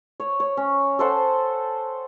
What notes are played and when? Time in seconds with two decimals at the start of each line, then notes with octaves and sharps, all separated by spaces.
0.20 C#5
0.40 C#5
0.57 C#4
0.99 A4 C5 F#5